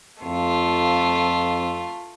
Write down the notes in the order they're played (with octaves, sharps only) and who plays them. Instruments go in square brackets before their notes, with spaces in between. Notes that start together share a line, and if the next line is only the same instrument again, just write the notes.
[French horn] F2 [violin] A3 F4